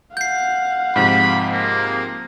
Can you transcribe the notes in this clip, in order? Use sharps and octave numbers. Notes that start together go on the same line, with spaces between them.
F5 F#5 G6 C7
G#2 C3 F3 B5
A#3